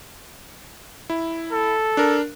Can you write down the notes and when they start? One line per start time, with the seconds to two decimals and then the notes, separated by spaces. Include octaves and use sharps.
1.10 E4
1.52 A4
1.97 D4 A#4